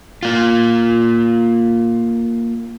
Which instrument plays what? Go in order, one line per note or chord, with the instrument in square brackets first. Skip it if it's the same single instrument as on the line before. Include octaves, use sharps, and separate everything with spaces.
[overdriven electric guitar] A#3 F4